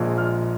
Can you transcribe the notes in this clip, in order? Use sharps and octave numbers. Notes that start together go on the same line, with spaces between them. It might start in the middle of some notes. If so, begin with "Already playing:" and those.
Already playing: A#1 A#2 G#3
F6